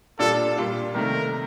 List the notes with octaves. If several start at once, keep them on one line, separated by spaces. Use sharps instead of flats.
A#2 G3 D4 F4 A4
A#2 G3 D4 F4
C3 D#3 A3 A#4